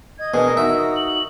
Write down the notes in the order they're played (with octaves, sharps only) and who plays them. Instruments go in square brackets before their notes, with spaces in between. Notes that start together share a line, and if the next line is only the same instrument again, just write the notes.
[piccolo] D#5 [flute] G#6
[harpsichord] B2 [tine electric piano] D4 G#4 [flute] A#4
[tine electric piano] D#4 F#4 [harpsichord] E5
[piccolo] D#6
F#7